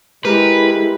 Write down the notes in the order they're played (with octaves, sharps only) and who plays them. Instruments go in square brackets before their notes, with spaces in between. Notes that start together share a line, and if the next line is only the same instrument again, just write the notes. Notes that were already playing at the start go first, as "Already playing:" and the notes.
[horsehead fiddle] G#3 E4 [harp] G4 A#4 [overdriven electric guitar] B4